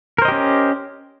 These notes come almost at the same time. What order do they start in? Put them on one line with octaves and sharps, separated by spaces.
A#4 C5 D#5 G4 C#4